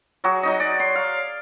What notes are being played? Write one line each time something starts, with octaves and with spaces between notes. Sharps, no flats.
F#3 F#4 G#4
F#3 D#4 D#5
D5
C6
F5